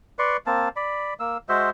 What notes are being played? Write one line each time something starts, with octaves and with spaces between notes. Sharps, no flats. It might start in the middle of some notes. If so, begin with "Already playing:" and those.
B4 D5 C6 C#6
A#3 C4 A5
D5 B5
A#3 E6
G#3 F#4 C5 E5